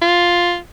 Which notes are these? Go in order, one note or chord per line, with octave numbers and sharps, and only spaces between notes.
F4